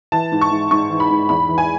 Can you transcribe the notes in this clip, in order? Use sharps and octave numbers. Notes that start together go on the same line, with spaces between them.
E3 A5
G#2
C#6
G#2
G#2 C#6
E3
B5
G#2
E2 B5
E3
G#5